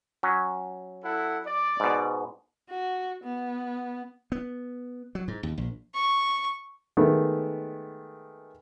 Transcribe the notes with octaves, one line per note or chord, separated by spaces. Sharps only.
F#3 C#4
E4 A4 F#5
D5
G#2 B2
F#4
B3
B3
F#3
G#2
D#2
A#1
C#6
D#3 G#3 A3 B3